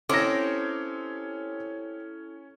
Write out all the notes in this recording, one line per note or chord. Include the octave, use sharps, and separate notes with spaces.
C4 C#4 E4 G4 A4 C#5 D6 A#6